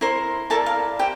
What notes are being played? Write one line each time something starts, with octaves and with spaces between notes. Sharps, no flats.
E4 A#4 C5 C6
E4 A4 A#4 D5 A5
F5
G4 C5 G5